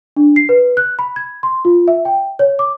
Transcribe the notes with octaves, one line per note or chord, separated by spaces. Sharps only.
D4
C7
B4
F#6
B5
G#6
C6
F4
E5
G5
C#5
D6